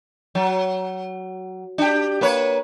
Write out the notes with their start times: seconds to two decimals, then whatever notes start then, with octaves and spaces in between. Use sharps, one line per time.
0.35 F#3
1.78 D4 G4
2.21 A#3 B4 C#5